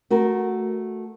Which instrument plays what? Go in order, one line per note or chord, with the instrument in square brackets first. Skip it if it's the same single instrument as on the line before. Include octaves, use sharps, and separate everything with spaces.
[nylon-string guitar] A3 F#4 A#4